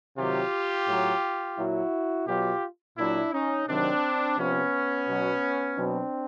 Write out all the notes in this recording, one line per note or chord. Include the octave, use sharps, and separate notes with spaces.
C3 D#3 F#3 F4 G4
A2 F#3
A#2 F#3 E4 F#4
B2 F#3 F4 G4
A#2 F#3 D4 E4
C#4 D#4
C3 D#3 F#3 C4 D4
C3 F3 B3 C#4
B2 F#3
B2 F#3 C4 D4